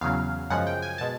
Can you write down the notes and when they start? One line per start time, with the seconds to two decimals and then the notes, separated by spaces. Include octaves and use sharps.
0.01 E2 C#3 F#3 F5
0.50 F#2 C#3 F3 G#3 F#5
0.67 G5
0.82 G#5
0.98 B2 G#3 A5